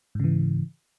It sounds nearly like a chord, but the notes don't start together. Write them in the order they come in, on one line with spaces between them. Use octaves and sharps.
G#2 C#3 E3